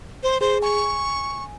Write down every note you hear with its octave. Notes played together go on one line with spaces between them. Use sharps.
C5
G#4 C5
G#5 C#6